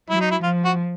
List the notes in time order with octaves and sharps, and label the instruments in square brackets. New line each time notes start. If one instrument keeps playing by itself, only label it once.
[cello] F#3 [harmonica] E4
[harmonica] D#4
E4
[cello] F3 [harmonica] F4
[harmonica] F#4